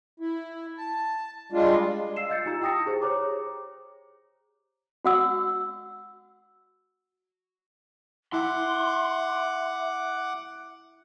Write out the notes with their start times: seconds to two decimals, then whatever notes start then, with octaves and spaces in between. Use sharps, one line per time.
0.20 E4
0.78 A5
1.52 G3 G#3 D4 F4
2.16 F5 E6 C7 E7
2.30 D#5 F5 G6 A6 C#7
2.46 D#4 F4 G4 A#5 E6
2.62 E4 G5 D#6 A#6 C#7
2.86 G4 G#4 C5
3.02 G4 C5 C#5 A#5 D6
5.05 F#4 F#5 E6
8.33 E4 E5 F#5 C6 D6